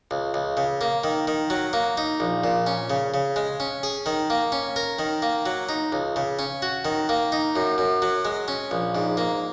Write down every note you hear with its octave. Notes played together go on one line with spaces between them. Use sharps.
C#2
C#2
C#3
A#3
D#3
D#3
F#3
A#3
D#4
A#1
A#2
C#4
C#3
C#3
G#3
C#4
G#4
D#3
A#3
C#4
A#4
D#3
A#3
F#3
D#4
C#2
C#3
C#4
F#4
D#3
A#3
D#4
F#2
F#2
F#3
G#3
C#4
A#1
G#2
A#3